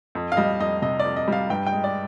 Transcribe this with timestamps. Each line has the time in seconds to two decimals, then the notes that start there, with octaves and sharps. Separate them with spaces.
0.15 F2
0.32 F5
0.37 G3 D#5
0.60 F2 D#5
0.82 C3 D#5
0.99 F2 D5
1.17 D#5
1.28 G3 F5
1.50 G2 G5
1.66 G5
1.72 G#3
1.84 D5